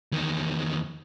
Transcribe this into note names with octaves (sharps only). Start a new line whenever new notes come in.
E2 D#3